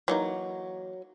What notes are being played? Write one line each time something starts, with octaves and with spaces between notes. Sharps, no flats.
E3 F#3 A#3 D#4